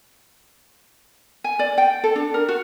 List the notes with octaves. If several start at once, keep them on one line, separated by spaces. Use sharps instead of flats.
G#5
D5
G5
A4
D4
A#4
F#4